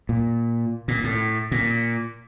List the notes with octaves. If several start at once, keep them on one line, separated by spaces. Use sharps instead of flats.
A#2
A#2
A2
A#2